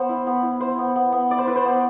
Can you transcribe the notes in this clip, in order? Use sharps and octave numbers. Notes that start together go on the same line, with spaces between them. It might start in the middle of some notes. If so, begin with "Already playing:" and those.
Already playing: B3 C5
E4
B3
E4
E4 C5
B3
B3
B3
E4 D5
C5
E4 B4
C5
B3